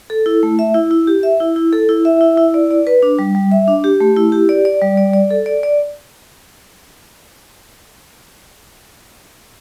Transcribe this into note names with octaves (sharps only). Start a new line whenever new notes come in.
A4
E4
A3
E5
E4
E4
G4
E5
E4
E4
A4
E4
E5
E4
E4
D5
D5
B4
D4
G3
G3
E5
D4
G4
A3
E4
G4
D5
D5
G3
D5
D5
A4
D5
D5